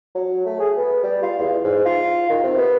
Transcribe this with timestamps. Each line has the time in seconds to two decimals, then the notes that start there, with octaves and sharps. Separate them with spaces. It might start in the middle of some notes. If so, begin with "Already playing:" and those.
0.15 F#3
0.45 A3
0.60 G#4
0.77 B3
1.03 G3
1.23 F4
1.39 E2
1.64 G#2
1.85 F4
2.30 D#3
2.43 C3
2.58 B3